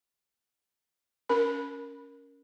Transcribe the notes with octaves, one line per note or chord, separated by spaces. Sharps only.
C#4 A#4 B5